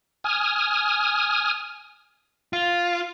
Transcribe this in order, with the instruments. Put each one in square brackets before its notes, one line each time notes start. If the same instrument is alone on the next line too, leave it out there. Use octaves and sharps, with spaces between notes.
[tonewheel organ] G#5 D#6 F6
[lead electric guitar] F4